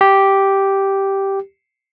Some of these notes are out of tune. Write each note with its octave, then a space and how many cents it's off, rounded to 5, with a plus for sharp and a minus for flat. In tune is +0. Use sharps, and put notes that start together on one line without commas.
G4 -5